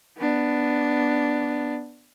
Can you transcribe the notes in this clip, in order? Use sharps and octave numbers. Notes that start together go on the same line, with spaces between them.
B3 D4